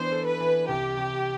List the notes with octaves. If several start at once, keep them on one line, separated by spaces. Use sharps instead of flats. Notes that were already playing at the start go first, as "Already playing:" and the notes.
Already playing: E3 B3 D4 C5
A4
B4
E3
C2 G4
C2